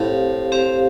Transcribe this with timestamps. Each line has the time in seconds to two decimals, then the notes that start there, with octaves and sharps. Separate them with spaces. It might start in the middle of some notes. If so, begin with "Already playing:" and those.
Already playing: A2 C4 G4 C5 F5
0.52 C4 G4 C5 F5